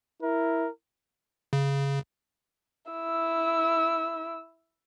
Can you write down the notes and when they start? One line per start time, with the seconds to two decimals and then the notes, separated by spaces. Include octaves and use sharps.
0.22 E4 A#4
1.53 C#3
2.91 E4 E6